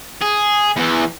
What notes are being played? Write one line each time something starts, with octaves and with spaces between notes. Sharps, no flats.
G#4
E2 E3